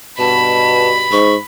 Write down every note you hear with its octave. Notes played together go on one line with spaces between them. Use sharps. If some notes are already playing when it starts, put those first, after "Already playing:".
G2 B2 A5 B5
G#2 C#6